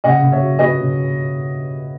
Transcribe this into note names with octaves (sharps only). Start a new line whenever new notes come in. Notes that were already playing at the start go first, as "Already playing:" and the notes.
C#3 D#5 F#5
C#3
C#5 E5
F#3
F#3 B4 D#5
C#3